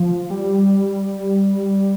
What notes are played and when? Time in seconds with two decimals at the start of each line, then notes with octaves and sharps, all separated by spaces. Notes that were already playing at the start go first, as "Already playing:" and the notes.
Already playing: F3
0.30 G3